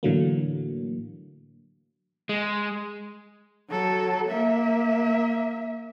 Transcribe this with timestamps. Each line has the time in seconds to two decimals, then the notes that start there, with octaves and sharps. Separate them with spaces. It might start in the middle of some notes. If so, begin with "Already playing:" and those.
0.03 A2 D3 E3 F#3 A3 A#3
2.29 G#3
3.70 F#3 A4
4.28 A#3 E5